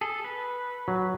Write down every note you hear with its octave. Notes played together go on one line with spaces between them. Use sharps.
G#4 A4
B4
F#3